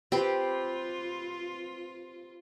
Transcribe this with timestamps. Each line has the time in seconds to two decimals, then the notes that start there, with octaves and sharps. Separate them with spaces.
0.12 C4 F4 G4 B4